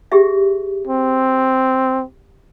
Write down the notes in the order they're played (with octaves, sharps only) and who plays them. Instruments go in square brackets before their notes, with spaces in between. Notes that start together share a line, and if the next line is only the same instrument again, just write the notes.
[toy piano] G4 G#4 E5
[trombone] C4